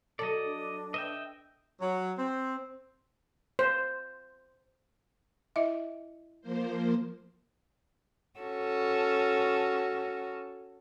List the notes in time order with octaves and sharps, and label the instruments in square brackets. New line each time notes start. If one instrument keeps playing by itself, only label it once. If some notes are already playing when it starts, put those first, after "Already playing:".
[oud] F#3 A4 [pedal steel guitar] D5 D#5
[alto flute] D4
[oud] B4 [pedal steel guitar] D#5 E5 G5
[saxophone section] F#3
C4
[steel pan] C5
[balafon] E4 D#5 E5
[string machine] F3 A#3 C5
[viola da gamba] C#4 F#4 A4